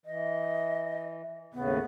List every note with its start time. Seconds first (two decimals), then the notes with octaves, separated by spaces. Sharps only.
0.06 E3 D#5
1.54 D#2 A2 C#3 B3